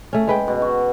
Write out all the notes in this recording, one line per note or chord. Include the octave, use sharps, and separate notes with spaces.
A3 C#4
G#3 B4 G5
B2
F#4